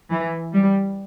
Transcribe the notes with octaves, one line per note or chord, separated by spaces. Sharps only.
E3
G3